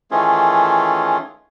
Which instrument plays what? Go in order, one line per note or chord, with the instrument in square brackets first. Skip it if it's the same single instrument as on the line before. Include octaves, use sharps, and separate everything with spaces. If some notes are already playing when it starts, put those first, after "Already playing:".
[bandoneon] D#3 E3 A3 C#4 F4 G#4